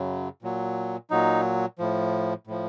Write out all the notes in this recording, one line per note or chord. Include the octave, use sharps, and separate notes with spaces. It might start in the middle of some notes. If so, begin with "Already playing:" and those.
Already playing: F#2 C#3 F#3
A#2 F#3
A#2 F#3 D#4
A2 F3
A2 F3